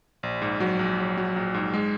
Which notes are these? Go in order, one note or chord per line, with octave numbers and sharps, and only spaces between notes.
A#1
G#2
F#3
A#1
F#3
F#3
A#1
G#2
G#3